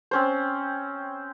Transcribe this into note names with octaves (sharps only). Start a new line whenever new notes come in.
C4 C#4 C5